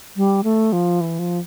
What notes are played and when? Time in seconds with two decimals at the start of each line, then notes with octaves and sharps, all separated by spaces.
0.16 G3
0.44 A3
0.73 F3
1.01 E3
1.19 F3